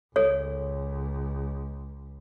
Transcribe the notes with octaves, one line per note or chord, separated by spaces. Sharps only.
C#2 A4 C#5